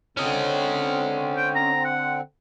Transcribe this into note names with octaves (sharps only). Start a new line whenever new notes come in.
D3 C4 C#4 D#5
G5
A#5
F#5